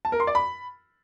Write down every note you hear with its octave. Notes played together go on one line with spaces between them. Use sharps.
A5
A#4
C6
D5
B5